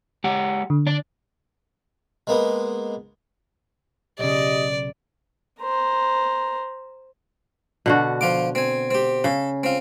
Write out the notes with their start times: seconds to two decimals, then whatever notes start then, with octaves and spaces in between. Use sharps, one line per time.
0.24 G#3 G4 F#5
0.70 D3
0.87 D4 D5
2.27 G#3 A#3 B3
4.19 B1 C#3 G4 D5 D#5
5.61 C5 A#5
7.86 B2 D3 F#4
8.21 F3 F4 D6
8.55 C4 G#5
8.91 C4 G4
9.24 C#3 A4
9.63 C4 F4